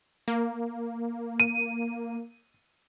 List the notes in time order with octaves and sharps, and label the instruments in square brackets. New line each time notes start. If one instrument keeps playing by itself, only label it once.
[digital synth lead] A#3
[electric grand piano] D#7